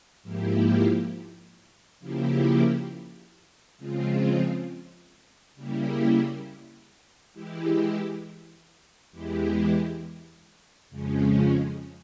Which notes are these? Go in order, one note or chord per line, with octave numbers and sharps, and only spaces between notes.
G#2 F3 A#3 E4 G4
C#3 F3 A#3 E4 G4
C#3 F3 G#3 C4 F4
C#3 G3 A#3 E4 G4
E3 G#3 E4 G4
E2 E3 G#3 E4 G4
F2 C#3 F3 G#3 C#4